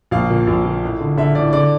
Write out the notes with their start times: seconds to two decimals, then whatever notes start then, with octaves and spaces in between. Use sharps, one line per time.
0.11 A#1 F5
0.30 A#2
0.47 A#1
0.65 A#2
0.83 A1
1.00 D3
1.17 D3 E5
1.35 A1 D5
1.53 D3 D5